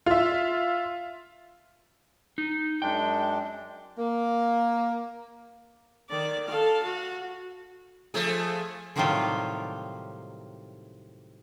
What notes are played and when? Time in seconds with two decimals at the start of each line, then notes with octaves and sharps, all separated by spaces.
0.06 F4 E5
2.38 D#4
2.82 F#2 G#3 D4 G5
3.98 A#3
6.10 D#3 D5
6.48 A4 F5
6.83 F#4
8.14 F3 A3 G#4
8.96 A2 C3 D#3 F#3 G3 F4